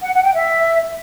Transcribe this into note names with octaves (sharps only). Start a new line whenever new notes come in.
F#5
F#5
G5
E5